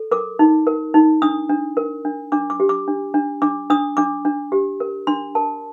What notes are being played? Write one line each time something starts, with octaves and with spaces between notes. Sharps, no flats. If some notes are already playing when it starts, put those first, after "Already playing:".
Already playing: A4
A#4 D6
D#4
A#4
D#4
D4 D#6
D4
A#4
D4
D4 D6
D6
G4
D6
D4
D4
D4 D6
D4 D#6
D4 D6
D4
G4
A#4
D4 C6
A#4 A5